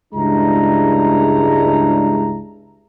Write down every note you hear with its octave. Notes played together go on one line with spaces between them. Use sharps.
C#2 G2 G#3 D4 E4 A#5